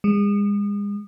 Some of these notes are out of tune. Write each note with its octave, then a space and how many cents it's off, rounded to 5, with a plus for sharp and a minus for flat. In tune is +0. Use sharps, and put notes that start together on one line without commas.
G#3 -35